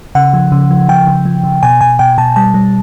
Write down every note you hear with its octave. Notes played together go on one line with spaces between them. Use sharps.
C#3 F#5
F3
C#3
F3
C#3 G5
C#3
F3
C#3
B2 G#5
B2 G#5
B2 G5
B2 A5
G3 A5
G3